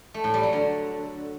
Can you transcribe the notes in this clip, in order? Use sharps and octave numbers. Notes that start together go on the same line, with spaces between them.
A3
A2
G3
F#3
D3